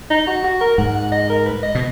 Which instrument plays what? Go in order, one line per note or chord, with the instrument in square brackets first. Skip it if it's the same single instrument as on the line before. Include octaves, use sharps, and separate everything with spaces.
[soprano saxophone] D#4
F#4
F#4
A#4
[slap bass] G#2 [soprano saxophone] F#5
[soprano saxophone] F#5
D#5
A#4
B4
D#5
[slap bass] B2